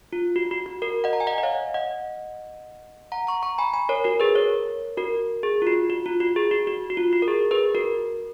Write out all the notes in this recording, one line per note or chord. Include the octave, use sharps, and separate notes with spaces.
F4
F#4
F#4
F#4
F#4 A#4
D#5 F#5
A#5
G#5
D#5 F#5
D#5
C#5 F5
D#5 F#5
F#5 A#5
A#5 C#6
A#5 C#6
G#5 B5
G#5 B5
A#4 C#5
F#4 A#4
G#4 B4
A#4 C#5
F#4 A#4
G#4
F4
F#4
F#4
F4
F#4
G#4
F#4
F#4
F#4
F4
F#4
A#4
G#4
G#4 B4
F#4 A#4